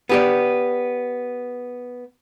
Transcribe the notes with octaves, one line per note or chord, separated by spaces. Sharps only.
B3 G4 D5